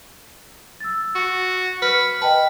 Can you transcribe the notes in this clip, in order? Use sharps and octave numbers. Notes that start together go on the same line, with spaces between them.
E6 A6
F#4
B4 F6 C#7
B4 D#5 G5 A5